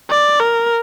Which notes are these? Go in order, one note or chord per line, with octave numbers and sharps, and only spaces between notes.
D5
A#4